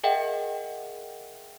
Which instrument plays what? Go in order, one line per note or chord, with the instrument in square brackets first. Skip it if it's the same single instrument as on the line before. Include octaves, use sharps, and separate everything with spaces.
[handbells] G#4 A#4 D#5 E5 F#5 G5